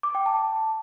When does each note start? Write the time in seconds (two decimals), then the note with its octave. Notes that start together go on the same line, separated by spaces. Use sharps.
0.03 D6
0.15 G5
0.26 A5